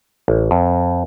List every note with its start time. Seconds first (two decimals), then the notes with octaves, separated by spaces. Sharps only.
0.28 A1
0.51 F2